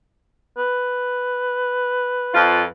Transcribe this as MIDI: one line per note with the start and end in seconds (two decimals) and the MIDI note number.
0.58 2.71 71
2.34 2.65 41
2.34 2.65 65